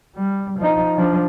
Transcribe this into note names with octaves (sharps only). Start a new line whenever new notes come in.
G3
F3 D#4
F3 D4